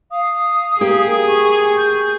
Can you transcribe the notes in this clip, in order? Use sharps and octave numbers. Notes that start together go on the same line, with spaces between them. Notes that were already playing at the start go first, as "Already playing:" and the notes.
F5 D#6
A#3 G4 G#4
C#6
G6